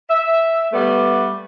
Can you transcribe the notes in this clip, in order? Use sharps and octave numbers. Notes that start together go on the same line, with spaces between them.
E5
G3 A3 B3 F#5